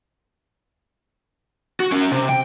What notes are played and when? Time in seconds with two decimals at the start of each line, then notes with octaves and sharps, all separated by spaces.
1.80 F#4
1.92 C#4 A#4
2.12 C3
2.29 G5